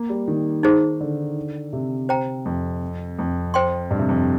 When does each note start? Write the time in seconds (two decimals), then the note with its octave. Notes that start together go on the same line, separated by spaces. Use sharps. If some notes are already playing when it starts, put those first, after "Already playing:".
Already playing: A#3
0.09 G3
0.28 D#3
0.63 D#4 G#4 C5
1.00 D3
1.73 C3
2.09 C5 G5 A#5
2.45 F2
3.19 F2
3.54 C5 G5 C6
3.91 G2
3.99 C3
4.09 F2